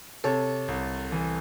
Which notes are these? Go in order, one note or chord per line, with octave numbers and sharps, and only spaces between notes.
C3 A4 C#5
C2
E3